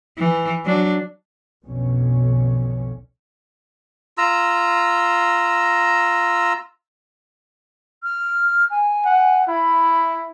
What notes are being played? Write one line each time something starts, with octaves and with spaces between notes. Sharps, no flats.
E3
F#3 D4
B1 F2 B2 D3 C#4
F4 A#5 E6
F6
G#5
F#5
E4 B5